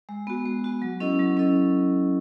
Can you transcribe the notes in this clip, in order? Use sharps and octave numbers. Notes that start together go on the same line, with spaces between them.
G#3
B3 F#4
G#3
B3 F#4
F#3
C#4 E4 A4 D#5
F#3
C#4 E4 A4 D#5